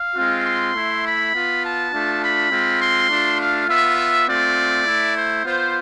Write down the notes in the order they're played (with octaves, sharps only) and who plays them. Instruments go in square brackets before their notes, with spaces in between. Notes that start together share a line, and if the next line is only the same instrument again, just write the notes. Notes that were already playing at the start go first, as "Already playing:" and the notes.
Already playing: [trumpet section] F5
G#3 C4 F4
C6
A3 E4
B5
B3 F4
A5
A3 D4 F4
B5
G#3 C4 F4
C6
A3 D4 F4
F5
B3 F4 E5
A3 C4 F4 D5
A3 E4
C5
B3 F4 C5